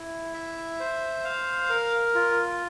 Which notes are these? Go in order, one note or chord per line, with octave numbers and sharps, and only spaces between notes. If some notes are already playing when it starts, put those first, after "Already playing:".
Already playing: E4
E5
C5
F5
A#4
F4